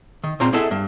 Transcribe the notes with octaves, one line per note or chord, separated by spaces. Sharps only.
D#3
A#2 C#3 C4 F4 A#5 C6
B3 E4 G#4 A4 D#5 E5
G2